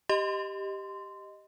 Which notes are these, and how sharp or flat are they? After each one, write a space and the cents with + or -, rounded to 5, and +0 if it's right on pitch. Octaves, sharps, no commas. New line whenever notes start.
G4 +0 D#5 +0 C6 -15